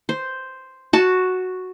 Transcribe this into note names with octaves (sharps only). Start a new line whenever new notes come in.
C5
F#4 A5